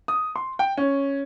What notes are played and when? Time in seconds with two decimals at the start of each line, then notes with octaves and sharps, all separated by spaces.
0.08 D#6
0.36 C6
0.59 G5
0.77 C#4